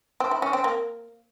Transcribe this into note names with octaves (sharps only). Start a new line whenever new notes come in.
C4
E4
C#4
C4
A#3